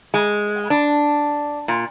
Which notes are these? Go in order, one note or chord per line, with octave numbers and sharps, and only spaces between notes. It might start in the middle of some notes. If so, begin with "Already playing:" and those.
G#3
D4
A#2